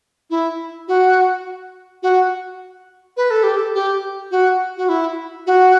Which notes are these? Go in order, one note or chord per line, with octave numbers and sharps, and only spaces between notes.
E4
F#4
F#4
B4
A4
G4
A4
G4
F#4
F#4
E4
F#4